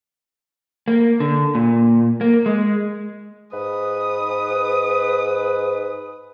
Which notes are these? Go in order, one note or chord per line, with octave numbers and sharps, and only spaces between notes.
A#3
D3
A#2
A#3
G#3
G#2 B4 D#6